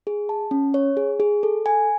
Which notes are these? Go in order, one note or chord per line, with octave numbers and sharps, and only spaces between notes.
G#4
A5
C#4
C#5
G#4
G#4
A4
G#5